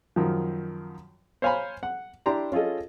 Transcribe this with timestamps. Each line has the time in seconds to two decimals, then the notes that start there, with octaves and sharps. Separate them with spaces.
0.16 F#2 D#3 F3
1.42 C5 C#5 F5 G#5 A#5 B5
1.83 F#5
2.26 D4 E4 G4 A#5 C6
2.52 C#4 F4 G#4 A4 D#5